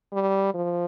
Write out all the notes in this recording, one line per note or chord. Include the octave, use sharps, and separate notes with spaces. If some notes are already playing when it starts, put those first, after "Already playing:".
G3
F3